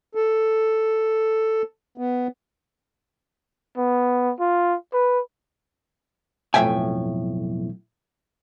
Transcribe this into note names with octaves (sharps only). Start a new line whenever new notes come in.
A4
B3
B3
F4
B4
B1 F2 A2 E5 G5 G#5